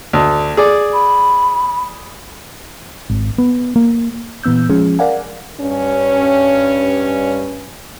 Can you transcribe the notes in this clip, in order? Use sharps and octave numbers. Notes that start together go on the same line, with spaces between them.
D2
G#4 D5
B5
G#1
B3
A#3
A#2 E3 B3 E6 G6
F3 G#3 C#4 G#4
A#4 D5 F5 F#5 G#5
G2 C#4